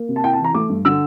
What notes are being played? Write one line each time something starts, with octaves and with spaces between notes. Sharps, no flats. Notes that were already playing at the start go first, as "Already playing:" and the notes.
Already playing: A#3
C3
A5
E4 G5
A5
E3
A#5
A3 D6
G2
D3 E6